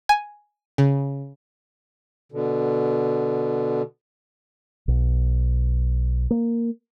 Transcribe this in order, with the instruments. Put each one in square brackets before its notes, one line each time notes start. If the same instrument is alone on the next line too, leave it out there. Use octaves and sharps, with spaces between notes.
[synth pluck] G#5
C#3
[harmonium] B2 D3
[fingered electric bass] B1
A#3